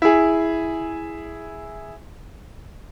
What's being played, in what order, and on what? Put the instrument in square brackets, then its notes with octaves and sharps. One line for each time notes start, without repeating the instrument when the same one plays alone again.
[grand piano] E4 G#4